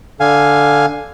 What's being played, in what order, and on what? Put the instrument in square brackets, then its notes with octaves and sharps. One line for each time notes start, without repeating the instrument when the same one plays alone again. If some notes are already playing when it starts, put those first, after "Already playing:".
[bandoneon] D3 F5 G#5